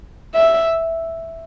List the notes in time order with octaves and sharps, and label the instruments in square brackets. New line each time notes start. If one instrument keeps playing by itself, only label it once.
[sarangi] E5